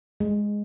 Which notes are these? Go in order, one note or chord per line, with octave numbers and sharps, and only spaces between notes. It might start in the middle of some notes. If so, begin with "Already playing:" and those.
G#3